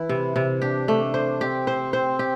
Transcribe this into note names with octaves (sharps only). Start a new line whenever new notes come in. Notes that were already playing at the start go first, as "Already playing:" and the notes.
Already playing: E3 E4
C3
C3
E4
D4 G4
A3
C5
C4 G4
C5
C5
G4